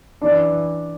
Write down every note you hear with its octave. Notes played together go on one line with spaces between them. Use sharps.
E3 D4